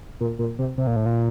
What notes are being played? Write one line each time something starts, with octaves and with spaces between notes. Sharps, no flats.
A#2
A#2
C3
C3
A#2
A2
A#2